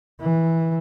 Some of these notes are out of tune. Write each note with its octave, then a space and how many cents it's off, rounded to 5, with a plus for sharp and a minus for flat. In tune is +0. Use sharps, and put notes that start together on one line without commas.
E3 -10